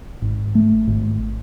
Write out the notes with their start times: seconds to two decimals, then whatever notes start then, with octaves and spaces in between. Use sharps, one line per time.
0.22 G#1
0.55 A3
0.87 G#1